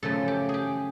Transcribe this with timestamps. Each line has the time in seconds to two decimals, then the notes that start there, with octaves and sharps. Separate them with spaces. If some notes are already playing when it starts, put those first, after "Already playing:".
0.03 F#2 C#3 F3 A3 A4
0.28 G4
0.49 G4 G#4